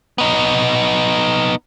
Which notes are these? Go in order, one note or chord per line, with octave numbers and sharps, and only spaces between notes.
B3 D#4